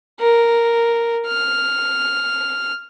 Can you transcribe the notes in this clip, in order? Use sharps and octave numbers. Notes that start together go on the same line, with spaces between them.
A#4
F6